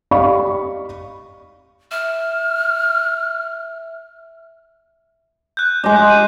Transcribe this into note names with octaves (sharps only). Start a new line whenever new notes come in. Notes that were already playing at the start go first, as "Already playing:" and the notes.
G4 D5 D#5 F5 B5 C#6
E5 F6
F#6 G6
G#3 D#5 D6
G6
D#7